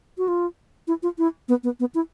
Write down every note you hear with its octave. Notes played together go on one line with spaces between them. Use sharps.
F#4
F4
E4
F4
E4
B3
B3
B3
E4